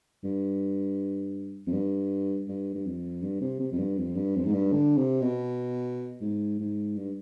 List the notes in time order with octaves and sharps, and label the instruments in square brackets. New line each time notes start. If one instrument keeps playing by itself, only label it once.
[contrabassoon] G2
F2
G2
G2
G2
F2
G2
C3
C3
F2
G2
F2
G2
F2
G#2
G2
D3
C3
B2
G#2
G#2
G2